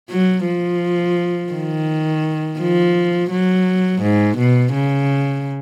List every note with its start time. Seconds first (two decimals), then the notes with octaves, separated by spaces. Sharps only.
0.10 F#3
0.46 F3
1.53 D#3
2.60 F3
3.31 F#3
4.02 G#2
4.38 B2
4.74 C#3